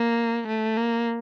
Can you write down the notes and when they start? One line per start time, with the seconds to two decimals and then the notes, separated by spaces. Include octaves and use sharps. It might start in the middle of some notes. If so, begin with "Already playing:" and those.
Already playing: A#3
0.48 A3
0.77 A#3